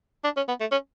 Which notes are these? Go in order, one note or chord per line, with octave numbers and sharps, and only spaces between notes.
D4
C#4
B3
A3
C#4